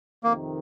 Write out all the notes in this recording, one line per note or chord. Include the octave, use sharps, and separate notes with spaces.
F2 C3 D#3 A#3